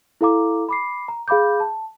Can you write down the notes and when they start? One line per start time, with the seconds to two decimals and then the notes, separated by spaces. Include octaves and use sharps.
0.21 E4 A4 F5 A#5 D6
0.69 B5 D6 C7
1.08 A#5
1.28 G#4 F5 B5 D6 G6
1.60 A5